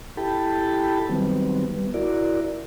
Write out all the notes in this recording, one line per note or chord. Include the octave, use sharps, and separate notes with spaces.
E4 G4 A4 G5 A5 B5
D#3 F#3 G3 B3 C4
G3 B3
E4 F#4 A#4 D5